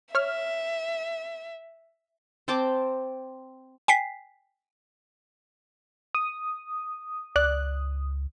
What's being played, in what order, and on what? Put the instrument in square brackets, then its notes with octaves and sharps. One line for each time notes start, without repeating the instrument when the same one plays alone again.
[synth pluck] C#5 F6 [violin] E5
[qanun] C4 G5 A5 D6
[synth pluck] G5 G#5 B6 C7
[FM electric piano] D#6
[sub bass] C#2 [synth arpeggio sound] D5 F#6